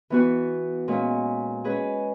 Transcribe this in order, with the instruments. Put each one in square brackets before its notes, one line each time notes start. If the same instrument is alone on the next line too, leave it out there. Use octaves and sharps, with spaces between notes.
[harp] E3 B3 F#4
A#2 G#3 C#4
G#3 C#4 G#4 B4